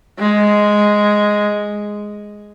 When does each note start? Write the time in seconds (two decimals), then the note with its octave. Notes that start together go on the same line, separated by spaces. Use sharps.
0.19 G#3